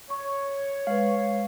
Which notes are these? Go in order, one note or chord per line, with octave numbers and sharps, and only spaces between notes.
C#5 C#6
G#3 B4 F5